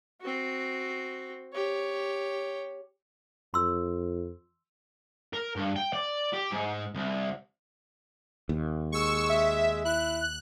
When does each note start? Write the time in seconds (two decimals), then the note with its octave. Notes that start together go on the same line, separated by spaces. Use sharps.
0.22 C4 F#4
1.54 G4 C#5
3.54 F2 C6 E6
5.33 A#4
5.56 G2
5.76 G5
5.93 D5
6.33 G4
6.51 G#2
6.95 C2
8.49 D#2
8.92 G#3 C#6 E6
9.29 E5
9.85 E4 F#6